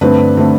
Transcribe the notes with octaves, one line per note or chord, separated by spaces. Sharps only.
G2 D3 A3 C4 B4
D3 A3 C4